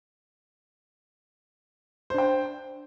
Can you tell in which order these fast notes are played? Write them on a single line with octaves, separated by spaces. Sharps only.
C5 D4 G5